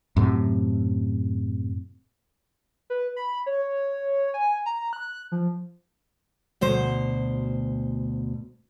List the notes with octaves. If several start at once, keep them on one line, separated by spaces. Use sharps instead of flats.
F#2 A2 C3
B4
B5
C#5
G#5
A#5
F#6
F3
D2 B2 C5